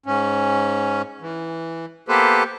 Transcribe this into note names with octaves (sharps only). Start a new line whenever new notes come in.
G#2 C#4
E3
A#3 B3 G4 A4 B4 C5